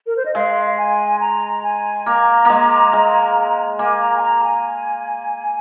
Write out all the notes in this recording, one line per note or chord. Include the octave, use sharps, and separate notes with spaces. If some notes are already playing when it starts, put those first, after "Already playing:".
A#4
C5
D#5
G#3 F5
F5
G#5
A#5
G#5
A#3 A#5
G#3 A#3
G#3
A#3 G#5
A#5
G#5
A#5
G#5